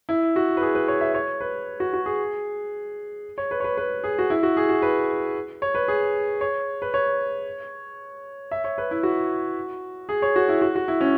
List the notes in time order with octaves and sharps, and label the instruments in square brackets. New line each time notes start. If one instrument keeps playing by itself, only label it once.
[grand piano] E4
F#4
B4
G#4
B4
C#5
E5
C#5
B4
F#4
F#4
G#4
C#5
B4
C#5
B4
B4
G#4
F#4
E4
F#4
G#4
F#4
B4
C#5
B4
G#4
C#5
B4
C#5
E5
C#5
B4
E4
F#4
G#4
C#5
F#4
E4
F#4
F#4
E4
C#4